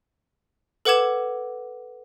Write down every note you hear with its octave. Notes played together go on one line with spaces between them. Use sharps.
A4 B4 F#5 D6 G#6 E7